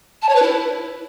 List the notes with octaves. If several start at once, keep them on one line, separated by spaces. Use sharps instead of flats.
A5
C#5
B4
E4